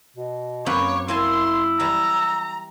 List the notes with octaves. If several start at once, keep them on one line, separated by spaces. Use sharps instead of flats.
B2
F#2 A#3 C4 B4 C#5 D6
A#3 E4 G#5 A5 C6 E6
E3 G3 A5 A#5